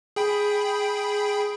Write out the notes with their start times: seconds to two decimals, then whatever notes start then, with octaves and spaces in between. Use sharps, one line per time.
0.16 G#4 G5 B5